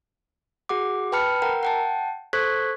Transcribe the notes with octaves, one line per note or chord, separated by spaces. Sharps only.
F#4 G#4 F#5 D6
B4 G5 A5 B5 F6 C#7
A#4 F#5 G5 A#5
F#5 G5 A5
A4 C5 C#6 F#6 G#6 B6